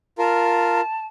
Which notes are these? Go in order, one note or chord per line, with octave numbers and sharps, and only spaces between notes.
F4 A#4 A5